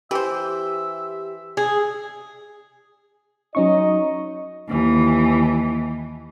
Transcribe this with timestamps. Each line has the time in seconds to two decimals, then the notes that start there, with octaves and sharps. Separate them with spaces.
0.11 E3 G4 C5 E5
1.57 G#4
3.55 F#3 C#4 D#4 D#5 C#6
4.68 D#2 E3